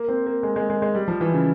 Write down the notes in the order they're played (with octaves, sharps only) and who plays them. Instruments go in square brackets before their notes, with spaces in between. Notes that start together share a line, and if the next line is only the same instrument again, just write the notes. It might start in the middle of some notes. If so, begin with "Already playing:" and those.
Already playing: [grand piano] A#3
C4
A#3
G#3
G#3
G#3
G#3
G3
F3
E3
C#3